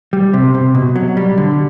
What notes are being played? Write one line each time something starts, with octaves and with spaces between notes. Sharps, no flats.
G3
C3
C3
B2
F#3
G3
D3